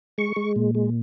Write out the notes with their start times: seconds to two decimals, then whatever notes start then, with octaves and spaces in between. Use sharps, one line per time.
0.18 G#3 C#6
0.36 G#3
0.56 A#2
0.75 G#3